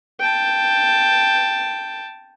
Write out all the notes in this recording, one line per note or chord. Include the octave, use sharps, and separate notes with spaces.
G5 A5